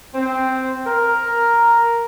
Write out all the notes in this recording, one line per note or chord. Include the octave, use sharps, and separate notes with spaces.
C4
A#4